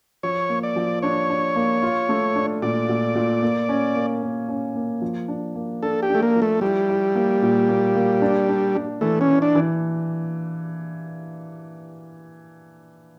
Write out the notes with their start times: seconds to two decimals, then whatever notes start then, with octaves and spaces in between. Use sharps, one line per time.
0.23 F3 C#5
0.49 A#3
0.63 D5
0.76 F3
1.02 D4 C#5
1.29 D4
1.56 A#3
1.82 F4
2.09 A3
2.35 D4
2.62 A#2 D5
2.89 A#2
3.15 A#2
3.42 A#3
3.69 C#4
3.96 A#3
4.23 A#3
4.49 C#4
4.75 A#3
5.01 F3
5.28 D4
5.55 A#3
5.82 D4 A4
6.03 G4
6.09 D4
6.15 A3
6.22 A#3
6.35 F3
6.42 A3
6.61 G3 E4
6.89 E4
7.15 A#3
7.42 A#2
7.69 A#3
7.95 A#3
8.21 D4
8.49 D4
8.75 D4
9.01 E3 A3
9.21 C#4
9.28 E3
9.42 D4
9.55 E3